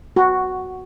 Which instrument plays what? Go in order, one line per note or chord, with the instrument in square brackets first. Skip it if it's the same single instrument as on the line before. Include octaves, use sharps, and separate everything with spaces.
[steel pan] F#4